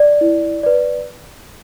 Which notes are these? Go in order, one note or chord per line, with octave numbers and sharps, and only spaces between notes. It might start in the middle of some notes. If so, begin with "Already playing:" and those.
Already playing: D5
E4
B4 D5